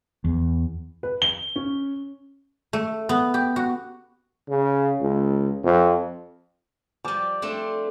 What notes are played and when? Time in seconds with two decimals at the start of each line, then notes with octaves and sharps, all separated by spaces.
0.24 E2
1.03 B4
1.22 G7
1.56 C#4
2.73 A3
3.09 B3
3.34 G4
3.56 F#4
4.49 C#3
5.01 C#2
5.64 F2
7.05 F3 G3 D6
7.42 A3 C4 D4